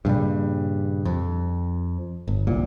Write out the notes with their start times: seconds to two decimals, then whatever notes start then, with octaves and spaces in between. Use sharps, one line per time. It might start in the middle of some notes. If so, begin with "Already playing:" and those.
0.05 G2 A#2 C#3 G3
1.05 F2
2.28 G1
2.47 D1 C2 A#2